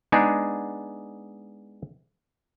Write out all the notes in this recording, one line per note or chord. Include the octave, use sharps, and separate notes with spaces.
G#3 B3 D4 D#4 G#4